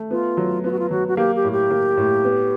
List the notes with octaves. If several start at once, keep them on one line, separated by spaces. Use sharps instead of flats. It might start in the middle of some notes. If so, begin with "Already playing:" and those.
Already playing: A3
B3 F4
F#3
B3 F4
F#4
F4
F#3 F#4
F#4
A#3 G4
G4
A2
G4
A#3
A2
B3